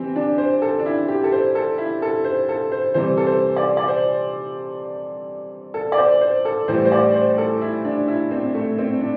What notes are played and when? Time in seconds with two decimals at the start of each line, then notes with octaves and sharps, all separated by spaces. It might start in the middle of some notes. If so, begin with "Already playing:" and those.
Already playing: E3 C4 G4
0.16 D4
0.38 C5
0.62 A4
0.80 D4
0.86 E4
1.08 G4
1.24 A4
1.32 C5
1.55 A4
1.78 E4
2.02 A4
2.24 C5
2.49 A4
2.72 C5
2.94 C3 E3 G3 C5
3.17 A4
3.27 C5
3.56 D5
3.77 D5
3.88 C5
5.74 A4
5.92 D5
5.98 C5
6.21 C5
6.45 A4
6.68 A2 E3 G3 C5
6.85 C5
6.92 D5
7.15 C5
7.38 A4
7.61 E4
7.85 D4
8.08 E4
8.31 C4
8.54 A3
8.78 C4
9.01 D4